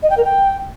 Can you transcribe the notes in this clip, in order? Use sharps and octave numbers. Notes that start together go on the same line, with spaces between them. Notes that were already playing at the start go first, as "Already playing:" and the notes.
D#5
G5
A#4
G5